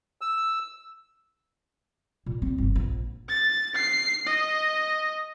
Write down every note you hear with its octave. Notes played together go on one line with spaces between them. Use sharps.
E6
A#2
C4
G1
A#1
A6
C7
D#5